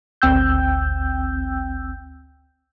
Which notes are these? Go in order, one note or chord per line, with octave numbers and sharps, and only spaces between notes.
G#1 D2 C4 G5 E6 G6